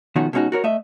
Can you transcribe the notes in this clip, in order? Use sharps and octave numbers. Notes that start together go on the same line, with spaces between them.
B2 D#3 F3 A3 C#4 F#4
B2 G#3 C#4 D#4 F#4
F#4 A#4 C#5
A3 D#5 E5